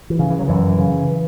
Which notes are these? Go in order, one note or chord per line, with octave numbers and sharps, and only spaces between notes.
E3
C#3
E3
F#3
F#2 E3
C#3